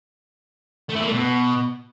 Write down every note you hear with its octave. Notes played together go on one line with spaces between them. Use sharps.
A3
E4
A#3
A3
B2